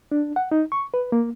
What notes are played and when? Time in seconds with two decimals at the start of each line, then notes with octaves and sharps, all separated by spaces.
0.12 D4
0.36 F#5
0.52 D#4
0.72 C#6
0.94 B4
1.12 A#3